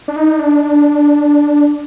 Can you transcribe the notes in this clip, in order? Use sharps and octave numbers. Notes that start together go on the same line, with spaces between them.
D4
D#4
D4